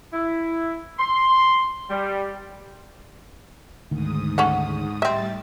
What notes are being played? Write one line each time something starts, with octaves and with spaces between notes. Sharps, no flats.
E4
C6
G3
D2 G#2 D#3 D#6
C#4 A4 F#5
A2 G3 C4 E5 A6